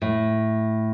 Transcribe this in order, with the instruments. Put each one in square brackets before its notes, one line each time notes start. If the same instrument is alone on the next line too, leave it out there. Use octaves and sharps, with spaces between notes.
[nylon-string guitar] A2